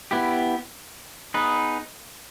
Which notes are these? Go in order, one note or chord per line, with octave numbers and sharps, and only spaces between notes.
B3 E4 G4
B3 D#4 G#4 B4